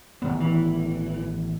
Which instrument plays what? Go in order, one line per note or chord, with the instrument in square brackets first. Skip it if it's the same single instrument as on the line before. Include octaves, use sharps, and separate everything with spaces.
[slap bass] A1 D#3 B3
[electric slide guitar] E3